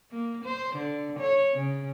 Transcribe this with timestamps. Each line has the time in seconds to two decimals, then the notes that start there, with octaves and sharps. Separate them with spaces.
0.12 A#3
0.44 C5
0.75 D3
1.19 C#5
1.55 C#3